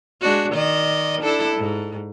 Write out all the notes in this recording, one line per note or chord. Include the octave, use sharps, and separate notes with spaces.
G#3 D4 F#4
D#3 D5 D#5
D4 E4 A4
G#2